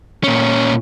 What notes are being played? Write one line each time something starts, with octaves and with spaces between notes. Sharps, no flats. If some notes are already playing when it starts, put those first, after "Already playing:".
A#2 C#4